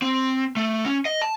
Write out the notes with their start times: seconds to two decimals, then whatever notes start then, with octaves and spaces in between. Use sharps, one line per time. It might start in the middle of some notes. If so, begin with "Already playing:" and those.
0.02 C4
0.57 A3
0.85 C#4
1.05 D#5
1.22 A5